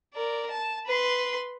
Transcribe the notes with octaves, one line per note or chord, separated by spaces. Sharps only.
A#4 D5
A5
B4 C6